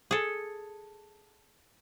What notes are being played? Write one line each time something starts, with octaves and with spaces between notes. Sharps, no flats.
G#4 A4